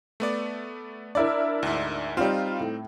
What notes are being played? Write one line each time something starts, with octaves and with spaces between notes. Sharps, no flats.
A3 B3 D5
D4 E4 A#4 D5
D2 G#2
G3 C4 D#4 F4
A2